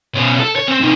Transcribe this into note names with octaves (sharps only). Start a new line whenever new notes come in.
B2 C#4
A4
C#5
C4
C3 D#4